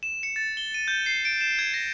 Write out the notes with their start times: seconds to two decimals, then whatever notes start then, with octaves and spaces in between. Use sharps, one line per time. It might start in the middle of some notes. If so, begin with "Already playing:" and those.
0.03 E7
0.23 C#7
0.36 A6
0.57 G7
0.74 D#7
0.88 G6
1.06 C7
1.25 D7
1.41 E7
1.59 G#6
1.74 A#6